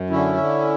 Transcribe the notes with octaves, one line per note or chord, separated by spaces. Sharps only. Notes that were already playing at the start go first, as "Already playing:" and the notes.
Already playing: F#2
D3 C#4 E4
D3